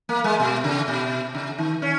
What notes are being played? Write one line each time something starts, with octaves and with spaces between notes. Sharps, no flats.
A#3
G#3
B2
C#3
B2
C#3
D#3
C#4